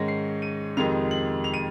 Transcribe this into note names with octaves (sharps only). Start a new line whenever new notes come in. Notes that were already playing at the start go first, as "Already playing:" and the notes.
Already playing: G#2 D#3 G#3 C#4 A#6
C7
D#7
F2 C3 D#3 G#3 F7
F#7
F7
D#7